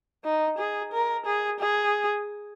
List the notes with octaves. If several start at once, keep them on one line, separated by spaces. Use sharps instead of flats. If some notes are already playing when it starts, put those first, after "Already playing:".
D#4
G#4
A#4
G#4
G#4